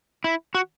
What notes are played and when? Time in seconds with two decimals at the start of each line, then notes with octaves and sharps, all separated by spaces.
0.24 E4
0.55 F#4